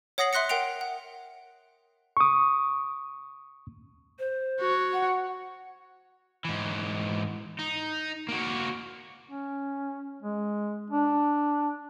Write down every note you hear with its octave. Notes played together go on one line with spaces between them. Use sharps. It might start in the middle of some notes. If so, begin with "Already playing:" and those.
C#5 F#5 D#6 A#6 C7 F#7
E5 C6 F#6 A#6 C#7
A#4 F#5 G5 C7 D7 F7
F#5
C#6 D#6
C5
F#4 C#5
F#5
G#2 E3
D#4
A#3 F#4
C#4
G#3
D4